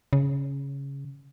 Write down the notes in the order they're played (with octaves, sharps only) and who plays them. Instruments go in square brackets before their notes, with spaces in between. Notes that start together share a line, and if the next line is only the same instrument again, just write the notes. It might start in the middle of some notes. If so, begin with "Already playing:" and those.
[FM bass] C#3